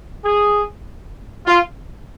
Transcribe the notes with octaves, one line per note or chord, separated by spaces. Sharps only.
G#4
F4